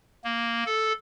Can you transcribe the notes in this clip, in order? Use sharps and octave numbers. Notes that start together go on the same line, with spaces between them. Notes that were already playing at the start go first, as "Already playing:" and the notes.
A#3
A4